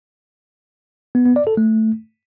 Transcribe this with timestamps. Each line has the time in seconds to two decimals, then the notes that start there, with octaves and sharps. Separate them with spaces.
1.15 B3
1.26 B3
1.36 D5
1.47 A4
1.57 A3